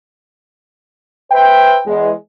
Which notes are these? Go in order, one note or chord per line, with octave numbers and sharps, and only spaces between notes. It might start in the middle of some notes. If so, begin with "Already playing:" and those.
B4 C5 E5 G5
E2 G#3